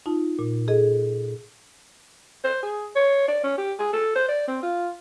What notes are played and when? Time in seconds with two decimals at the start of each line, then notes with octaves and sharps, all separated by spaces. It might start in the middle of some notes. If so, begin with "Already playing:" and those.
0.06 D#4 F4 A5
0.39 A#2
0.68 G#4 A4 D#5
2.44 C5
2.63 G#4
2.96 C#5
3.28 D5
3.44 C#4
3.58 G4
3.79 G#4
3.93 A4
4.16 C5
4.29 D5
4.48 C4
4.63 F4